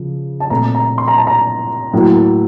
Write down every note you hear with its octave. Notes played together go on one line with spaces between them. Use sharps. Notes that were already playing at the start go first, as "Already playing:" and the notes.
Already playing: C#3 F3
A5
A#2 A3 C4 A#5
A#5
C6
A#5
A5
A#5
A2 F#3 A#3